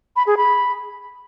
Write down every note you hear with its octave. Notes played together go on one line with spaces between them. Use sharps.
B5
G#4
B5